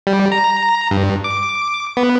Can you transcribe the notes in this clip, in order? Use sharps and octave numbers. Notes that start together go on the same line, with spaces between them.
G3
A#5
G2
D6
B3